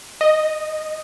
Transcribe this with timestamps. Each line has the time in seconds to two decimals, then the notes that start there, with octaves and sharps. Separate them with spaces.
0.21 D#5